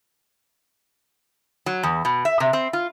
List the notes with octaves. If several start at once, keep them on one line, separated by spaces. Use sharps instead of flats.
F#3
E2
B2
E5
C3
C4
F4